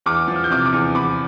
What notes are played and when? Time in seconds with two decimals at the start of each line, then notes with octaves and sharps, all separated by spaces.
0.06 E2 D6 F6
0.28 F3
0.36 F6
0.44 G6
0.50 C3 D6 F6
0.65 D6 F6
0.72 E2
0.95 E2 B5 D6